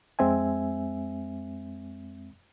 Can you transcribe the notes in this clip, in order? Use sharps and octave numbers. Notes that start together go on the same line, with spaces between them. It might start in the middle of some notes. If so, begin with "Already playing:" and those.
F2 G#3 C4 E5 G#5